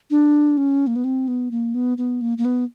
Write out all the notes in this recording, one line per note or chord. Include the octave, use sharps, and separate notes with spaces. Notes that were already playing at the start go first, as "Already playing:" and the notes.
D4
C#4
A#3
B3
C4
B3
A#3
B3
B3
A#3
A#3
B3